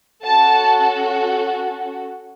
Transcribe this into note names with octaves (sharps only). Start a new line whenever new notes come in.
C#4 F#4 A4 A5